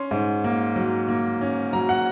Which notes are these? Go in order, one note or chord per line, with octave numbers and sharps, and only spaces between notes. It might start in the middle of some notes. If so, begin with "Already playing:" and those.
Already playing: C#4 C6
G#2
A#3
F#3
A#3
C#4
F#3 A#5
F#5